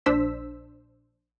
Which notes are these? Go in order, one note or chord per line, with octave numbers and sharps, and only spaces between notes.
A#1 D4 C5 E6 B6